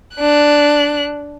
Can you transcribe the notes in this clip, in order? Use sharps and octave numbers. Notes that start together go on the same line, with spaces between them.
D4 F#6